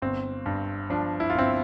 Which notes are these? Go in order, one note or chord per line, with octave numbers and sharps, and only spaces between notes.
G1 C4
G2
F3 D4
E4
F4
G1 C4 E4